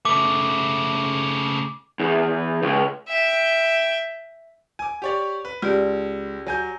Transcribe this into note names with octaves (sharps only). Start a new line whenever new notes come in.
C#3 A3 D6
E2
C#2
E5 G5
G#5 D6
G4 C#5 D5
B4
C#2 F4 G4 D5
F#3 G#5 G6